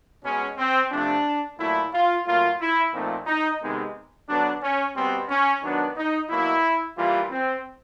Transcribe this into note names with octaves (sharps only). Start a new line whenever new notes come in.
B2 G#3 B3 C#4
C4
C3 F3 A3 D4
A#2 F#3 A3 E4
F4
A2 F#3 A#3 F4
E4
A#2 F3 A3 C4 D#4
D#4
C3 D#3 G#3 B3 D#4
D3 F#3 B3 D4
C#4
B2 G3 B3 C4
C#4
D#3 F#3 B3 D4
D#4
B2 F#3 A#3 E4
E3 G3 A#3 F4
C4